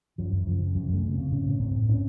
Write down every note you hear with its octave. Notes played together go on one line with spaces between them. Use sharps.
F#2 F3
F#2
C#3 F3
C#3
F#2 F#3
C#3 A3
C#3
C#3 C4
A2 C#4
A2
A2 C4
A2
A2 C#4